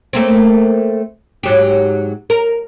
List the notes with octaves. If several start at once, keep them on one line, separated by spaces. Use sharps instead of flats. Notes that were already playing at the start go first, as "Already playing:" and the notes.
A3 A#3 C4
G#2 F#3 G4
A#4